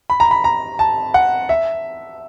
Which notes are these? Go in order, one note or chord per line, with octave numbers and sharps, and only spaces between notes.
B5
A#5
B5
A#5
A5
F#5
E5